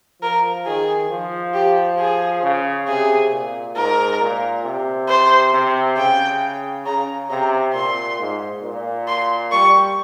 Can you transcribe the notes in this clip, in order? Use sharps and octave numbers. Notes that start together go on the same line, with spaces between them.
F3 A#4
D#3 G#4
F3
G4
G#4
C#3
C3 G#4
A#2
G#2 A#4
A#2
C3
C5
C3
C#3 G5
C#3 A#5
C3 A#5
A#2 C6
G#2
A#2
C6
G3 C#6